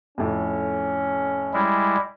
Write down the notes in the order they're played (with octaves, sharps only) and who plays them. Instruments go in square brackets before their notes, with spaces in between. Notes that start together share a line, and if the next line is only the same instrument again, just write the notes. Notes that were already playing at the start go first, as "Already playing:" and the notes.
[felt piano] F2 A2 [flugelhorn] C#4
[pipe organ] G3 G#3 E4